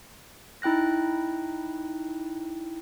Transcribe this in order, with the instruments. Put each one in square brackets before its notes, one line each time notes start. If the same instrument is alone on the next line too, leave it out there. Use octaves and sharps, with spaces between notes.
[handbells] D#4 E4 G5 F#6 A#6